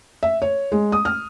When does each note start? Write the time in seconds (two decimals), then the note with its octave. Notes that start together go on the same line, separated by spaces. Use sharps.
0.23 E5
0.42 C#5
0.72 G#3
0.92 D#6
1.05 F6